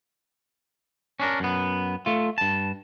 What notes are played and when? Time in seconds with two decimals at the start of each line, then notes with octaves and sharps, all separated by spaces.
1.20 C#4 D4 A#4
1.40 F#2 B3
2.06 A3 F4
2.38 G2 A5